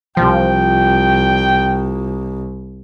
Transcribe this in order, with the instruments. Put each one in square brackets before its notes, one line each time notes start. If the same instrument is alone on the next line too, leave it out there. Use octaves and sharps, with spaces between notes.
[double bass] C2 [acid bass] F3 [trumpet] G5